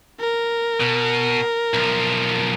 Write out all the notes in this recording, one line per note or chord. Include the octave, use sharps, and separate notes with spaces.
A#4
B2
B1 F3